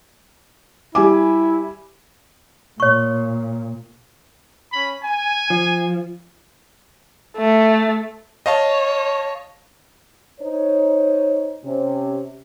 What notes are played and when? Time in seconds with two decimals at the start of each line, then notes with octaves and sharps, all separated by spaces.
0.95 G3 E4 G#5 D6
2.80 A#2 C#5 C#6
4.71 C#4 B5
5.02 G#5
5.50 F3
7.38 A3
8.46 C#5 D#5 F5 A5
10.41 D#4 C5 C#5
11.65 C3 C#4